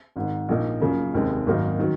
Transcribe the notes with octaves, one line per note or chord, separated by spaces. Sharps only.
G#1 G#2 D#3
A#1 A#2 F3 A#3 D#4
F#1 F#2 C#3 F3 A#3
F1 D#2 D#3 G#3 C4
G#1 F#2 D#3 A#3 D#4
D#3 F#3